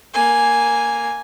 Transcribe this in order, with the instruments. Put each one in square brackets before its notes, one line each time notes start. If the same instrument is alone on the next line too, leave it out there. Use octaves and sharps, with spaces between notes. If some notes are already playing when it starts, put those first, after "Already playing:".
[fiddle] A#3 G#5